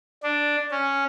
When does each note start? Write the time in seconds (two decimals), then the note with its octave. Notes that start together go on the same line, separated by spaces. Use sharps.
0.23 D4
0.71 C#4